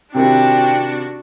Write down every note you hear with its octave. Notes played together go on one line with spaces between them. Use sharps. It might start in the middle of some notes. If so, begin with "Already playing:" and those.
C3 D#3 C4 D4 E4 F#4